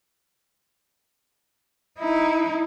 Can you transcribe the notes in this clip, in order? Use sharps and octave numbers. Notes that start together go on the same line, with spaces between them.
D#4 E4